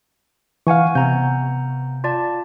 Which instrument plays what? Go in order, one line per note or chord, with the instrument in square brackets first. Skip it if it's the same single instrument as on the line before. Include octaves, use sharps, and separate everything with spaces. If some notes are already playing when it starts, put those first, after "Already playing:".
[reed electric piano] E3 F5 [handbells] F#5 G#5 C#6
[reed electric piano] C3 [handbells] B3 A#5 G6
[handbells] F4 D5 A5